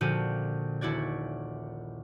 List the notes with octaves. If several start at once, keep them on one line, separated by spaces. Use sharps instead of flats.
A#1 A#2 D3 F#4 G4 D#7
D#1 E4 F#4 D5 G#6